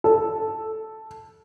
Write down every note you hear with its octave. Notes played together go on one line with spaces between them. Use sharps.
A4